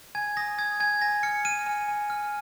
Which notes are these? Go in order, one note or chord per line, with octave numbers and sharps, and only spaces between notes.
G#5 G#6
D#6 A#6
D#6 G#6
G#5 G#6
G#5 A#6
F6 C#7
F6 D#7
G#5
G#5
F6